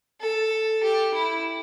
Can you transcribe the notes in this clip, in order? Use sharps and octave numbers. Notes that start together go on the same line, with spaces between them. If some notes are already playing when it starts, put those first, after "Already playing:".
A4
G4
E4